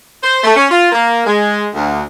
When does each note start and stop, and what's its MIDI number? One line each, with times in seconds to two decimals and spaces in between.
0.22 0.41 72
0.44 0.55 57
0.56 0.67 61
0.71 0.88 65
0.92 1.23 58
1.26 1.67 56
1.75 2.03 38